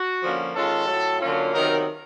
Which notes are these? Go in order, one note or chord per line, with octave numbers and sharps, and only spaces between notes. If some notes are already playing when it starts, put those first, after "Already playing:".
Already playing: F#4
D3 F3 A#3 C#4
D#3 G#3 C#4 F4 A4
A2 F#3 A3
D3 F#3 A#3 C#4 F4
C3 D#3 F#3 B3 D#4 A#4